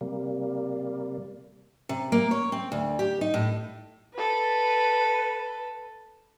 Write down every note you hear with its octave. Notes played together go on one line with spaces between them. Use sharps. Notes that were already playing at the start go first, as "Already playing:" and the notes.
C3 G3 A#3
C3
A#3
C#5
C4
D2
G4
D#4
A2
A4 B4